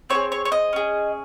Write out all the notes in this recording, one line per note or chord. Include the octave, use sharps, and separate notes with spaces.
C4 F4 G#4 C#5
C#5
C#5
D#5
C#4 G#4